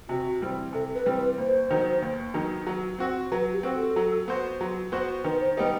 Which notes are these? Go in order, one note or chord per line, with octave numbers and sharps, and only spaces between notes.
C3 F#4
E3 G3 C4
C3 A4
B4
E3 G3 C4
B4
D#2 C5
D#3 F#3 B3
D#2
D#3 F#3 B3
F#3
C4 F#4
F#3 B4
G4
C4 F#4
A4
F#3
B3 F#4 C5
F#3
B3 F#4 C5
D#3 B4
C5
G3 B3 D#4 G4 B4